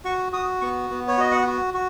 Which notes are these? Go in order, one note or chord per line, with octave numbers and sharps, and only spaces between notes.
F#4 C#6
F#4 D#6
B3 C#6
B3
C#5
F#4 D#5
F#5
F#4
F#4